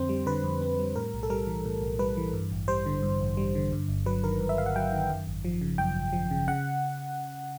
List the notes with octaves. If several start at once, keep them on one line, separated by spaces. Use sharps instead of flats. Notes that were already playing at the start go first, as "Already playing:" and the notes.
Already playing: F2 D3 C4 C5
G3
D3 B4
F2
C4
G3
A2 A#4
B1
A4
G3 A#4
E3
A2
B1
G3 B4
E3
G2
A1
G3 C5
D3
G2
A1
G3
D3
G2
G1
F#3 B4
D#3 A#4
G2
E5
G1 F5
F#5
F#3 G5
D#3
F#2
G#1
F3
C#3
F#2 G5
G#1
F3
C#3
C#3 F#5